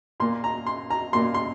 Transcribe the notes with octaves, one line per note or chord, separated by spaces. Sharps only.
A#2 A#3 C6
A#5
C6
A#5
A#2 A#3 C6
C6